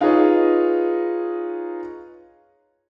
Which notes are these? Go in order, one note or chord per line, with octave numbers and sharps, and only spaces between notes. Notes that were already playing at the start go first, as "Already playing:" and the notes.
D#4 F4 G#4 B4 C#5 D#5